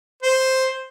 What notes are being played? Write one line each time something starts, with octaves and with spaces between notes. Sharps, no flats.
C5